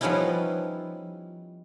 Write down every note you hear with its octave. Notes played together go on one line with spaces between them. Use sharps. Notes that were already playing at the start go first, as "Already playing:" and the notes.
F3 G3 B3 C#4 D#4 E4